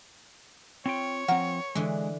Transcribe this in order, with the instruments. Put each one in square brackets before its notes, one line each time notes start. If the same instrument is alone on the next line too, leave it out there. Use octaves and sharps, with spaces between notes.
[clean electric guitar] C4 F4 G5 [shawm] C#5
[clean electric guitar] F3 C4 [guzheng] A#4 [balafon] F#5
[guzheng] D3 E3 [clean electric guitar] G#3